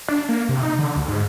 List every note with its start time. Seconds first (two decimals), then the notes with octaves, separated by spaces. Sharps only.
0.08 D4
0.29 A#3
0.49 C3
0.63 D#4
0.79 D3
0.97 D2
1.08 G#2